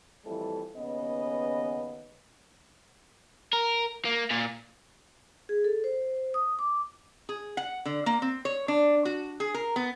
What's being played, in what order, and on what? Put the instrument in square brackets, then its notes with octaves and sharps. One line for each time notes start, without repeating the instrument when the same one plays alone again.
[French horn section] F2 A2 E3 G3 A4
D#2 C#3 B3 C#4 B4 D#5
[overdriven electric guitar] A#4
A#3
A#2
[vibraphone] G#4
A4
C5
D#6
D6
[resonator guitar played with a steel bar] G#4
F#5
D3
A#3
C4
C#5
D4
F#4
G#4
A#4
B3